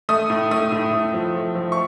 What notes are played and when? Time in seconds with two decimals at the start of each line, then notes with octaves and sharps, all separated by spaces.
0.09 A3 D#6
0.30 A2
0.51 A3 D#6
0.72 A2
0.93 A2
1.14 F3
1.35 A3
1.55 F3
1.72 C#6